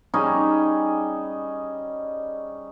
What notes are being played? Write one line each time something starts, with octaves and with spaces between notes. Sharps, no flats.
G3 C#4 D#4 G#4